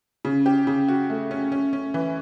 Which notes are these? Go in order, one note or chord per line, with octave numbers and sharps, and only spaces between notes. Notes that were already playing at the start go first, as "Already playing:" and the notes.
C#3
G4
C#3
F#4
A3
C#4
C#4
C#4
E3